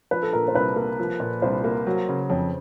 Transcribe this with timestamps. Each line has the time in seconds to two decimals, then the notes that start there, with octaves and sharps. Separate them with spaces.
0.11 F3 B4
0.23 A4
0.33 A#2 A#4
0.48 C5
0.55 C2 B4
0.76 A#3
0.99 F3
1.20 A#2
1.42 C2 C5
1.64 A#3
1.87 F#3
2.09 C#3
2.30 F2 C#5